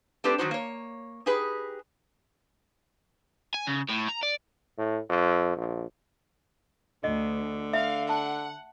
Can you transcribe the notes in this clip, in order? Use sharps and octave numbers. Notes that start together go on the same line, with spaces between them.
A3 C4 D4 G4 B4
D#3 F#3 D#4 F#4 C5
A#3 C#5
D#4 G4 G#4 B4
G#5
C#3
A2
A#5
D5
A2
F2
A#1
D2 D3 D#5
E5 F5
F#5 A5